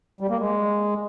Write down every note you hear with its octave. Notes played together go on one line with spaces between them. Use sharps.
G3
A#3
G#3